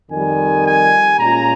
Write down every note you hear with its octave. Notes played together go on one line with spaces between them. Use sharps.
F2 D#3 G3 G#5
G#5
A#2 G#3 C#4 F4 A#5